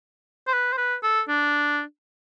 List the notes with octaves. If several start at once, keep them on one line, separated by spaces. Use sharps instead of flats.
C5
B4
C5
B4
A4
D4